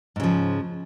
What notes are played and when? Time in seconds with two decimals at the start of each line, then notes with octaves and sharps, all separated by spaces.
0.16 G#2
0.20 C#3
0.24 F3